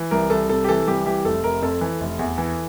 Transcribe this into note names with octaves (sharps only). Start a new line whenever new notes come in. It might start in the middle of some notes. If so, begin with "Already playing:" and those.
Already playing: E3
C2 A#4
C2 A4
C3 A4
G4
E3 A4
C2 G4
E3 G4
F1 A4
F1 A#4
F2 A4
E3
F1
E2
E3